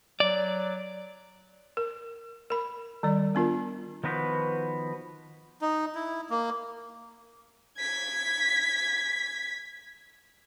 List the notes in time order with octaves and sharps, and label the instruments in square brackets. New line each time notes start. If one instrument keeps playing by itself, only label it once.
[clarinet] F#3 [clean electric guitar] D5
[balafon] A#4
A#4 B5
D#3 G3 D5
B3 D4 F4 A#4
[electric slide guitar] D#3 F3 B3 F#4 B4 C5
[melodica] D#4
E4
A#3
[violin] G#6 B6